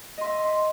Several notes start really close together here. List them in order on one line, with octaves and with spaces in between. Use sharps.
D#5 C6 E5